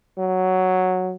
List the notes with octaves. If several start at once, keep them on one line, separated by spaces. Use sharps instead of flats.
F#3